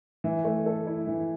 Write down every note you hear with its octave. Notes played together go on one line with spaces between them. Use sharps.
E3
A3
A4
E4
E3